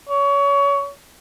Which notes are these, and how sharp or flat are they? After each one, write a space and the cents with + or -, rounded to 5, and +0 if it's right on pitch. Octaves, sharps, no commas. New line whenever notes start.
C#5 +25